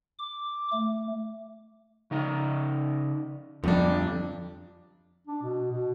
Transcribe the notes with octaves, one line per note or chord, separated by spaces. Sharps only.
D6
A3
C#3 D#4
F2 D3 G3 D4
D4
B2
B2